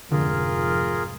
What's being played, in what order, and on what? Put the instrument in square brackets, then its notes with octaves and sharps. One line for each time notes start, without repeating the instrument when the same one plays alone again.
[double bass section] F1 G#2 F3 [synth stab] D3 [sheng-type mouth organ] F4 G#4 A#4